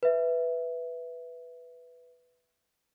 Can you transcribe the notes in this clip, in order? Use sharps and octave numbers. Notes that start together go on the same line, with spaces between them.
B4 E5